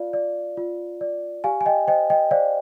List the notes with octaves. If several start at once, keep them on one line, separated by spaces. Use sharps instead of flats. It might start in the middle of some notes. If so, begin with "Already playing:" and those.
Already playing: F4 D5 F5
D5
F4
D5
G4 F5 G#5
G#5
D#5 G5
C5 D#5 G5
D#5 G5
C5 D5 F5